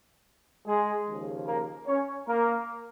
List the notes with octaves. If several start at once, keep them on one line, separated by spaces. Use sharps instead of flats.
G#3 G#4
D#2 C#3 F3
A#3 A#4
C#4 C#5
A#3 A#4